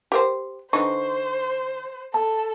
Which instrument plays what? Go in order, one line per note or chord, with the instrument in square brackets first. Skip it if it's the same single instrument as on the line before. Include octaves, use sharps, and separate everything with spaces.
[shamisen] G4 A#4 C5
[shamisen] D3 E3 D#4 [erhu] C5 [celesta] C#6
[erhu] A4 [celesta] A5